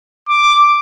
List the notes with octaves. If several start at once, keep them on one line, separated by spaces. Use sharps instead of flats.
D6